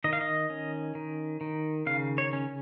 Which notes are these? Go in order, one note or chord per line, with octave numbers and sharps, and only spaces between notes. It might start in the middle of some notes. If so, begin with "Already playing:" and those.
D#3 D#5
F5
D#5
C#4
D#3
D#3
C#3 F5
C#5
C#4